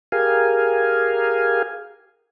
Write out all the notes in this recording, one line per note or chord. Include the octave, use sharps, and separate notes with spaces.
G4 G#4 A#4 F5 G#5